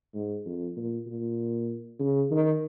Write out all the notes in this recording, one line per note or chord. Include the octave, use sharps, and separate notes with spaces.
G#2
F2
A#2
A#2
C#3
D#3